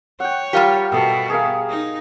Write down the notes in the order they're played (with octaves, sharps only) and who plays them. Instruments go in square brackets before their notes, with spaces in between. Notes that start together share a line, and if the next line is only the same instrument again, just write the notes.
[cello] C#5 [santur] F#5 G5
[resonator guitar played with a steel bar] G3 F4 G4 [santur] A#4
[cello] B2 B3 [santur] A4 D#5 E5
[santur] G#4 A#4 F5
[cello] D#4